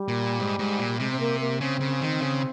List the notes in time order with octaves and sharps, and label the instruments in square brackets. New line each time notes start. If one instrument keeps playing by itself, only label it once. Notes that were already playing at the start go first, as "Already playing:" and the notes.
Already playing: [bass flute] G3
[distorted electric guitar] A#2
G#2
G#2
A#2
[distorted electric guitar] C3 [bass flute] G#3
[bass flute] C4
A#3
A#3
[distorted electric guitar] C#3 [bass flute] C4
[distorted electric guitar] C#3
D#3
C#3